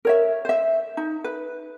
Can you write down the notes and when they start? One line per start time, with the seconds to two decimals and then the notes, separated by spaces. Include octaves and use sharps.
0.05 A#4 C#5 E5
0.45 C5 E5
0.97 D#4
1.24 B4